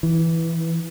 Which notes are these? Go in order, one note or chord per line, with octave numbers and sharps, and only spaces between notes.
E3